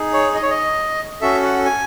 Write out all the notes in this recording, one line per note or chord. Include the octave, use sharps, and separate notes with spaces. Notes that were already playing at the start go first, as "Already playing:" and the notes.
Already playing: D#4 G#4
C#5
D#5
C#5
D#5
C#4 F#4 A4 E5
F#5
G#5